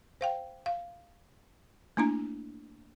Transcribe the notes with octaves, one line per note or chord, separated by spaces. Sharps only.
C5 F5 G5
F5
A3 A#3 D4 E4 A#5